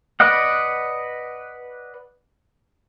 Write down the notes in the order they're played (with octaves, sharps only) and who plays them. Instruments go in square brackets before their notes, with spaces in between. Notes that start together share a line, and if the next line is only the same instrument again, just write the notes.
[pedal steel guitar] B4 D5 D#5 F#5